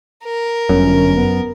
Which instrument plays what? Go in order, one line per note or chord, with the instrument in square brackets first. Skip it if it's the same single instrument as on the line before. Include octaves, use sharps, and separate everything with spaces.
[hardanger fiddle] A#4
[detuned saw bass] G1 [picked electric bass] F#2 [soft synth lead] C#4
[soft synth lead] B3